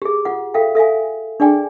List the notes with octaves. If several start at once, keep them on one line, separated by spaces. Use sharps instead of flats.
G4 G#4
F4 F#5
A4 E5 F5 G5
A4 E5 F5 G#5
D4 G#4 D5 G5 G#5